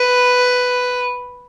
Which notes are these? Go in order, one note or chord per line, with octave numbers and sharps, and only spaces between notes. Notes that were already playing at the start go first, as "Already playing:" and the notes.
Already playing: B4